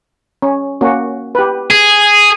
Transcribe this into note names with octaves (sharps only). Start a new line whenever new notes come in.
C#4
A#3 C#4 F#4
G4 B4
G#4